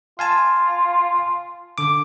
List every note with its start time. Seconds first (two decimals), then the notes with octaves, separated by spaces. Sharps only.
0.19 F4 F5 G#5 A5
1.78 D3 D6